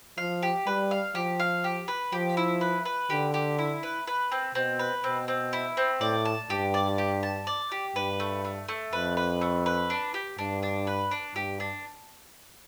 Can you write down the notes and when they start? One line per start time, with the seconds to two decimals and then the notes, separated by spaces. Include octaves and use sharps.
0.18 F3 F5
0.43 G4
0.66 G3 B4
0.91 F5
1.15 F3 G4
1.40 F5
1.64 G4
1.88 B4
2.12 F3 G4
2.37 E4
2.61 B4
2.85 B4
3.10 D3 G4
3.34 G4
3.59 E4
3.83 B4
4.07 B4
4.32 C4
4.55 B2 C4
4.79 B4
5.04 B2 C4
5.28 C4
5.53 E4
5.77 C4
6.01 A2 D5
6.25 A5
6.50 G2 G4
6.74 D5
6.98 G4
7.23 A5
7.47 D5
7.72 G4
7.96 G2 B4
8.20 A3
8.45 A3
8.68 A3
8.93 F2 B4
9.17 B4
9.41 A3
9.66 B4
9.90 D4
10.14 G4
10.39 G2 D4
10.63 D4
10.87 B4
11.11 D4
11.35 G2 G4
11.60 D4